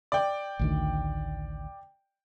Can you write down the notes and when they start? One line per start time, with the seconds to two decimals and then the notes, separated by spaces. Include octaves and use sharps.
0.12 D5 G5
0.59 A1 D2 D#3